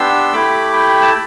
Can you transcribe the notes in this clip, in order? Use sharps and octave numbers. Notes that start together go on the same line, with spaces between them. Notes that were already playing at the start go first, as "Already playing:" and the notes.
Already playing: B3 D4 G4 C6 E6
A3 E4 G4 B5 D6
G5 B5
A5